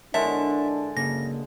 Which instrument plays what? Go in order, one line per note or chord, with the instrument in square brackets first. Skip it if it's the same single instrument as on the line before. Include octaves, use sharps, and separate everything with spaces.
[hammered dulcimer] D3 G#3 A5 [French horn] D4 [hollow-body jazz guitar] E4 A#4 C#5 [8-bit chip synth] E5
[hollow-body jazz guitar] C#3 A#3 C#4 [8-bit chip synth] A#6